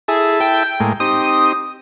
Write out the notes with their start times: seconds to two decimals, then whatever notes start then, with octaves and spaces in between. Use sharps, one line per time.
0.08 E4 G#4 A4 E5
0.40 G5
0.80 A2 G#3 A#3
1.00 C4 D#4 G4 D#6